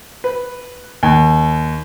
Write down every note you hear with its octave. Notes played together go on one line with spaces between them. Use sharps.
B4
D#2